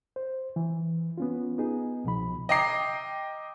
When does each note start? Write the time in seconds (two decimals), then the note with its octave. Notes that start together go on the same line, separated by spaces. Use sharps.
0.16 C5
0.56 E3
1.18 B3 C#4 F4
1.58 B3 D#4 G#4
2.04 C2 B2 F3 B5
2.49 D#5 G5 A#5 D6 C7